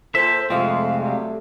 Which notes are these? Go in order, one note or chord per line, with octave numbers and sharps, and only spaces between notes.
A#2 A4 C5 E5
F2 C3 G#3 A3 C4 F5
F#3 G3